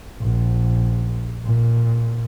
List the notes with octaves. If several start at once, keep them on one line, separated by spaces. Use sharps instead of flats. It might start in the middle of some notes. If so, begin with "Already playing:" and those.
A#1
A#2